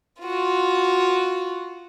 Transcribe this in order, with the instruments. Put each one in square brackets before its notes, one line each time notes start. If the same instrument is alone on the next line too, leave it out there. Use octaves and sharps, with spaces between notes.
[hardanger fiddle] F4 F#4